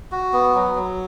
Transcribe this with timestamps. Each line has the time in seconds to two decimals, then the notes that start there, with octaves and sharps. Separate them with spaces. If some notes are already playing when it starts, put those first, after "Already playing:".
0.12 F#4
0.33 B3
0.55 F#3
0.75 F#3